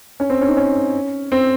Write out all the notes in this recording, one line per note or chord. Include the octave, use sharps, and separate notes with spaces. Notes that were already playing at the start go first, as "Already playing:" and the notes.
C#4
C4
C#4
D#4
C#4
C4